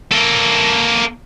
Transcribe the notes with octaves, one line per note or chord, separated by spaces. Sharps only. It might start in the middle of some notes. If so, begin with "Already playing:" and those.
A#3 A4